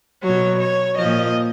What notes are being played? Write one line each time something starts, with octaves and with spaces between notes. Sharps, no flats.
B2 F#3 C#5
C#5
A#2 F3 D#5